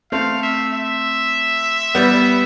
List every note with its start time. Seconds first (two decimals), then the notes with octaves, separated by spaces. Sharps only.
0.12 A3 C4 F5
0.43 E5
0.73 E5
1.95 G3 B3